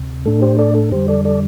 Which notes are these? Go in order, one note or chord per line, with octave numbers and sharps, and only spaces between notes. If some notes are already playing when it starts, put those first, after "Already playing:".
Already playing: D2 C3
A2 A3 D4 A4
G4 C5
A4 D5
A4
F2 D3 G3 G4 C5
A4 D5
A4 D5